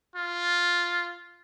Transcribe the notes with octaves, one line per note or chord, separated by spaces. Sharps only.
F4